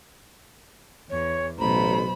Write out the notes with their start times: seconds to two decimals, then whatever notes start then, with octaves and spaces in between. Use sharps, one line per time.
1.10 E2 C#5
1.58 A1 B2 F#3 C5 A#5 B5